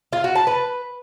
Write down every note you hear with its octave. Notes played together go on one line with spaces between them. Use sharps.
F4
F#4
A5
B4